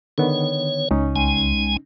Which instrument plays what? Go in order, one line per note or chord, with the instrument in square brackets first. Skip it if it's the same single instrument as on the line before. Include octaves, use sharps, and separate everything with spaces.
[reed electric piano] D3 D#3 B3 [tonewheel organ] C#5
[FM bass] C#2 [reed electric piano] C#4 D#4
[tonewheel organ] C2 G#3 G#5